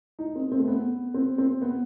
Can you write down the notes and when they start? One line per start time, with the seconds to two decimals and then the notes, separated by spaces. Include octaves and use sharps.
0.19 D#4
0.35 C4
0.51 C4
0.60 A3
0.68 B3
1.14 C4
1.38 C4
1.62 B3